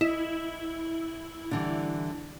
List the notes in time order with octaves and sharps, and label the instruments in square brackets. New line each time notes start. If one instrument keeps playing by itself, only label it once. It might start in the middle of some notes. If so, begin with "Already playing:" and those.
[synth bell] E4 [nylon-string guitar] D#5
[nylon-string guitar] D3 E3 G3